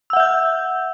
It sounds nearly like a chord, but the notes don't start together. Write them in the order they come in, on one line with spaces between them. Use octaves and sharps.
E6 F#5 E5 G6